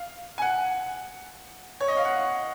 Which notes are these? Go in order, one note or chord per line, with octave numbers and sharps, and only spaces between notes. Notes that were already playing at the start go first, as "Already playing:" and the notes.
Already playing: F5
G#5
F#5
C#5
D#5
F5
F#5